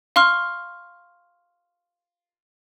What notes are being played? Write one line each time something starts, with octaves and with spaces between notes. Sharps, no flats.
F5 C6 C#6 F6